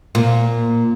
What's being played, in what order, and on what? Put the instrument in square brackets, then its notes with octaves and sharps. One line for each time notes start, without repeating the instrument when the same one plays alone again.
[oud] A#2